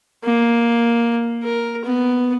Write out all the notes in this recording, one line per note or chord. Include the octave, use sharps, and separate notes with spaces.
A#3
A#4
B3